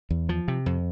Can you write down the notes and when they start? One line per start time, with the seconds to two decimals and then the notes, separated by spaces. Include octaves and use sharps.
0.10 E2
0.29 F3
0.48 C3
0.66 F2